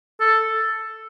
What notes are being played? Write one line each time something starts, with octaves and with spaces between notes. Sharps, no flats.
A4